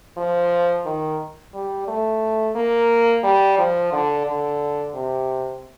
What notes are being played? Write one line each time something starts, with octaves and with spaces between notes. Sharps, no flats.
F3
D#3
G3
A3
A#3
G3
F3
D3
D3
C3